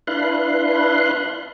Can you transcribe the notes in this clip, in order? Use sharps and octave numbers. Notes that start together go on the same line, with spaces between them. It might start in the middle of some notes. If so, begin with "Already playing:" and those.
D4 E4 B4 F5 C6 F#6